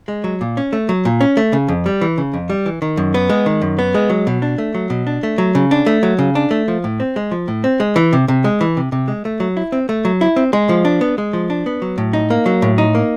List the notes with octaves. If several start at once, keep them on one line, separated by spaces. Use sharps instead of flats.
G#3
F#3
A#2
C#4
A3
F#3
A#2
C#4
A3
C#3
F2
G3
E3
C#3
F2
G3
E3
D#3
F#2
B3
G#3
D#3
F#2
B3
G#3
F#3
B2
D4
A3
F#3
B2
D4
A3
F#3
C#3
D4
A3
F#3
C#3
D4
A3
F3
A2
C4
G#3
F3
A2
C4
G#3
E3
C3
C3
G#3
E3
C3
C3
G#3
A3
F#3
E4
C4
A3
F#3
E4
C4
G#3
F3
D4
B3
G#3
F3
D4
B3
F#3
A2
D#4
A#3
F#3
A2
D#4
A#3